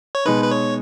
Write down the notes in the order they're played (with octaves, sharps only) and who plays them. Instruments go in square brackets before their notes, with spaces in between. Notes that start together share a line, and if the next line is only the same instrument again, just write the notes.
[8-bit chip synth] C#5
[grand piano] B2 G#3 D#4 [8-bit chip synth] B4
[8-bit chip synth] B4
C#5